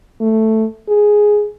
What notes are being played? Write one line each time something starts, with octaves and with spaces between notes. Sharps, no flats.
A3
G#4